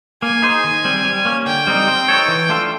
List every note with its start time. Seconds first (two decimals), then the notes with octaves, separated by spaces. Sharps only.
0.22 A#3 G#5
0.42 D#4 G#4 C5
0.64 D#3
0.84 G3 C4
1.05 G3
1.25 A#3 C#4
1.46 D3 G5
1.67 G3 C4 D#4
1.87 C4
2.08 D#4 F#4 A4 C#5
2.28 E3
2.49 A3 D4 F4 A4